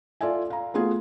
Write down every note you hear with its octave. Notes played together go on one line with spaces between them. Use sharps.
F4 A4 D5 E5 G#5
F5 A#5
A3 B3 F4 F#4 G#4